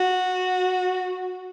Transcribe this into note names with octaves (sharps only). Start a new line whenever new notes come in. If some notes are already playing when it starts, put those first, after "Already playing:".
Already playing: F#4